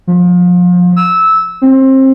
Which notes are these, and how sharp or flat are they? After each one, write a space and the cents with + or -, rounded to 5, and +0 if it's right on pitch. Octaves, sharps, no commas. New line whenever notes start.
F3 +30
E6 -15
C4 +25